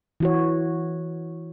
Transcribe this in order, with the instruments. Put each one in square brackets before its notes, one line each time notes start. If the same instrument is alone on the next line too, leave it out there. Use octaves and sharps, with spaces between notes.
[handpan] E3 F#4 C#5